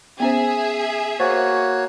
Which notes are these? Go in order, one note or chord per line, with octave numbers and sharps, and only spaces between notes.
B3 C#4 G#4 C5 E5
A#3 F#4 C5 C#5